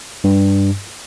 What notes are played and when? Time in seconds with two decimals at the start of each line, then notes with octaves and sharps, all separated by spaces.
0.24 G2